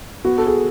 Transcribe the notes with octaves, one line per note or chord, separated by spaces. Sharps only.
B3 F#4
A4
G#4